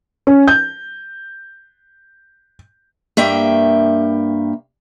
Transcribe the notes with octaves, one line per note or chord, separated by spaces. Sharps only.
C#4
G6
G2 A#3 E5 G5